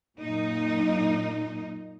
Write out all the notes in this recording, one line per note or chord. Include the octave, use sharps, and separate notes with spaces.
F#2 A#2 D#4